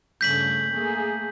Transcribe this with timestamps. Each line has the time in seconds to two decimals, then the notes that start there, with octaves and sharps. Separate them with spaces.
0.21 G2 C#3 A3 G6 B6 F#7
0.70 A3 A#3 G#4